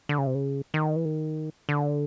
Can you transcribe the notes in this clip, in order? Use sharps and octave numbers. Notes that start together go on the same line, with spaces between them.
D3
C#3
C3
C#3
D#3
E3
D#3
D3